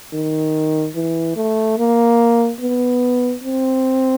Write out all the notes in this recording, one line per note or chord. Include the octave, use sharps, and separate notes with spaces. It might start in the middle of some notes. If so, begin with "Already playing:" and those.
D#3
E3
A3
A#3
B3
C4